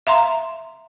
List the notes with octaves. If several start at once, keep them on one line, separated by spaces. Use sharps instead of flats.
E5 F5 A#5 C6